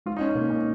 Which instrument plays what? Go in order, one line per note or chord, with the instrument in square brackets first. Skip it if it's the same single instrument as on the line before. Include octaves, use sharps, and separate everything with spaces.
[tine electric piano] G#3 [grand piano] F4
[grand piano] D#4
C#4
[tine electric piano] B2 [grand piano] A#3
[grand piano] C#4